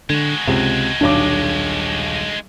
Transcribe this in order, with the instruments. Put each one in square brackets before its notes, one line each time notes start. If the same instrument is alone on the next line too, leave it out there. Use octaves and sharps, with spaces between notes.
[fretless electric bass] D3 [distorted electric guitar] G#3 F#4
[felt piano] C#2 [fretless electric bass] C3
[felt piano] D#1 B1 D6 [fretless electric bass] D4